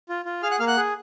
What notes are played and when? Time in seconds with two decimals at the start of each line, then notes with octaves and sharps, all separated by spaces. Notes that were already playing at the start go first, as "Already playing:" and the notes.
0.09 F4
0.25 F4
0.42 G#4 F5 F6
0.51 F#5 F#6
0.60 A#3 F5 F6
0.67 F#5 F#6
0.77 G#4